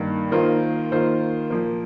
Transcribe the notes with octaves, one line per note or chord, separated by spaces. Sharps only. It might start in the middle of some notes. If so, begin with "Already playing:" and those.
Already playing: G2 D#3 A#3
D#3 A#3 F4 C5
D#3 A#3 F4 C5
A#2 F3 A#3